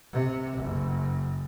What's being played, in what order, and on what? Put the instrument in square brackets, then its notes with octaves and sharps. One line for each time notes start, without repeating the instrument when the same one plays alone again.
[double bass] C3
F#1